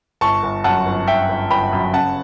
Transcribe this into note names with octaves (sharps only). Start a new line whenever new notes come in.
G1 A5 C#6
G1
F#2 F#5 A5
G1
G1 E5 G5
G1
G1 G5 B5
F#2
C#3 F#5 A5